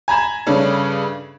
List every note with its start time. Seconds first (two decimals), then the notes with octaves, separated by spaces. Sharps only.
0.08 G#5 A#5 B5 G#6 E7
0.46 G2 C#3 A3 C#4 D4